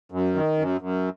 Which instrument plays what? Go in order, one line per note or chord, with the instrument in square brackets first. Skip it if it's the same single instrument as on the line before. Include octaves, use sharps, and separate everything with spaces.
[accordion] F#2
D#3
F#2
F#2